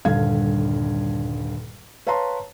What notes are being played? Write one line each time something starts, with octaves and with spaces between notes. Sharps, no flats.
D#1 G2 D3 F5 G#6
B4 C#5 F5 A5 A#5 C6